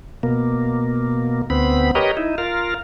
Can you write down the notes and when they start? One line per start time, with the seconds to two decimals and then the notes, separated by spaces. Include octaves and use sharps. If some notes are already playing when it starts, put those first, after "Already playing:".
0.23 B2 A#3
1.50 D2 B3 C4 B5
1.95 G4 A#4 B4 C#5 D#5
2.17 D#4 E4
2.38 F4 A#4 F5